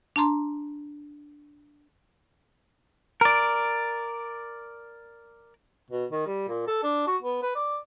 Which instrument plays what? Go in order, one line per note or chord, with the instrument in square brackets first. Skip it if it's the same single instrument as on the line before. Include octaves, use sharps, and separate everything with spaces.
[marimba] D4 A5 A#5 C6
[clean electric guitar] A#4 D5
[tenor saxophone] B2
D#3
G3
A#2
A4
D4
F#4
B3
B4
D5